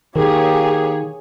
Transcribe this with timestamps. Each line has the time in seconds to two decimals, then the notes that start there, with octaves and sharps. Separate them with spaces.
0.16 D#3 A#3 G4 G#4 C#5